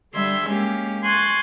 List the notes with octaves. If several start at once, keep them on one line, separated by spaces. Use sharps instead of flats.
D3 G3 E5 C6 G#6
G#3 A#3 C#4 G4
G#5 C6 C#6 F#6 A6